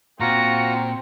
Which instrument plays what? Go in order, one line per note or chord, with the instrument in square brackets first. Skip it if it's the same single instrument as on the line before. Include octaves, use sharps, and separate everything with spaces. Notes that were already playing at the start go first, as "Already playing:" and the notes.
[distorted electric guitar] A#2 [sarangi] C4 [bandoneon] F4 F#4 A#5 [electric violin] A#6 C#7